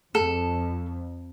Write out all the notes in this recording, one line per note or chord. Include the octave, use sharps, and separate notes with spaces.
F2 A4